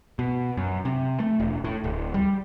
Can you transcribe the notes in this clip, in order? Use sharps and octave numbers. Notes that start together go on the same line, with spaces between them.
B2
F#2
C3
A3
E1
A2
D1
G3